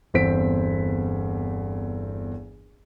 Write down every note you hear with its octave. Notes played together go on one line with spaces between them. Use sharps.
G1 E2 C4 C5 B6 D7